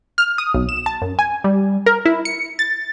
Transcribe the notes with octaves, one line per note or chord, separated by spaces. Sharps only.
F6
D#6
B1
E7
A5
F#2
G#5
G3
A#4
E4
C#7
A6